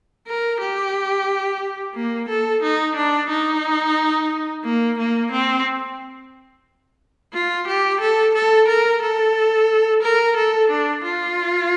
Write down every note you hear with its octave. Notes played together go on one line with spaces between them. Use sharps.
A#4
G4
A#3
A4
D#4
D4
D#4
A#3
A#3
C4
F4
G4
A4
A4
A#4
A4
A#4
A4
D4
F4